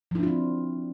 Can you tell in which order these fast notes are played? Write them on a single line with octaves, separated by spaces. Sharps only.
F3 E4 D4 F4 C4